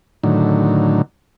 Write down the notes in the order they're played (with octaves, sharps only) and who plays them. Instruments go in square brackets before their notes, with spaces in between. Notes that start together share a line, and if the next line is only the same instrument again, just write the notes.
[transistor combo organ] A2 D3 D#3 F#3